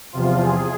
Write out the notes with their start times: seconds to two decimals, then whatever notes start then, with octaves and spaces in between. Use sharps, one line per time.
0.13 E2 C3 F3 F4
0.42 G#4